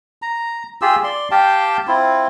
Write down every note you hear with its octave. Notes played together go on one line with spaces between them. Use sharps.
A#5
F4 G4 G#4 E6
D5 C6
G4 F5 G5 A5
C4 E4 F4